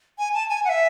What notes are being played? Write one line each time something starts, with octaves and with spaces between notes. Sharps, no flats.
G#5
A5
G#5
F#5
E5